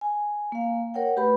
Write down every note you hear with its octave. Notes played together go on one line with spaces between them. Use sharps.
G#5
A#3 F5
A#4 C#5 F#5 G5
A3 G4 B4 B5